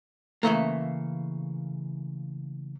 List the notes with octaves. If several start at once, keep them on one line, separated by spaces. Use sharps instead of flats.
C#3 E3 A3 A#3